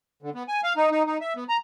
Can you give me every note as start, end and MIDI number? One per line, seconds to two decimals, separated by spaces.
0.23 0.30 50
0.35 0.43 59
0.48 0.61 80
0.64 0.73 77
0.77 0.89 63
0.91 1.03 63
1.07 1.18 63
1.21 1.34 76
1.36 1.44 59
1.49 1.57 82